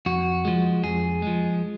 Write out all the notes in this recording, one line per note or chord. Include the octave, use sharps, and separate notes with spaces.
F2 F#4
F3 G#3
F2 G#4
F3 G#3